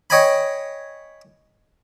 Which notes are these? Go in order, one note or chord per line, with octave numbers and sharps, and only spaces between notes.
C#5 D#5 G5 G#5 B5